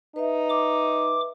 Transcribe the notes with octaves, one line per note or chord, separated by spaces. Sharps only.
D#4 B4 E5
D6